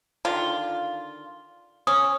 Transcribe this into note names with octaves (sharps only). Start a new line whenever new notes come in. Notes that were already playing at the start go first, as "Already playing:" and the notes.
D3 D#3 F4
C#4 D#6